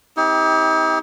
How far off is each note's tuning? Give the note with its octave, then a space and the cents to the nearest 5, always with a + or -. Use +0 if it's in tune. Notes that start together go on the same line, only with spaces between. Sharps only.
C4 +0 D#4 +45 G4 +15